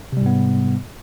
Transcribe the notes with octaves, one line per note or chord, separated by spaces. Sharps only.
G#2 C3 G3 B3